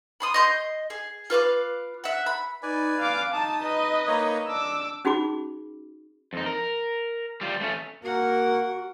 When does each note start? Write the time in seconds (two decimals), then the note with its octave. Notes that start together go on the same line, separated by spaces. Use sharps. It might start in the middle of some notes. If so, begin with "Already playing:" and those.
0.20 B5 C6 D#6
0.34 D#5 C6 G6
0.90 G#4
1.30 F4 B4 F5 D6
2.04 E5 F#5
2.26 B5
2.63 D#4 B4 D5 G#5
2.99 F5 D6
3.34 D#4 A5 D#6
3.63 B4 D#5
4.07 A#3 D#4 C#5
4.48 D4 D6 E6
5.05 C#4 D#4 F#4 G#4 B5 D6
6.33 F2 D#4
6.46 A#4
7.41 G3 F4
7.61 A3 C#4
8.04 A#3 F#4 A#4 F#5